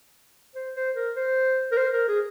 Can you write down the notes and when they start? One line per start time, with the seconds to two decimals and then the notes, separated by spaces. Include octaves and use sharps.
0.55 C5
0.76 C5
0.96 A#4
1.16 C5
1.72 A#4
1.77 C5
1.93 A#4
2.08 G#4